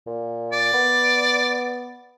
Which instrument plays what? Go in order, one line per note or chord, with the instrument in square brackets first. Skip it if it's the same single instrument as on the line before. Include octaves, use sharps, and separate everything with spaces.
[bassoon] A#2
[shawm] D5
[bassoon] B3